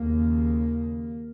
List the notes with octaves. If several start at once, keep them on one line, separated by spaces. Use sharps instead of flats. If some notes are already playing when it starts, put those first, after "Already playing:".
Already playing: D#2 C#3 A#3